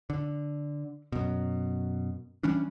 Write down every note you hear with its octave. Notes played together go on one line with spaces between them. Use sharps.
D3
F#2 B2
E3 G3 C#4 D4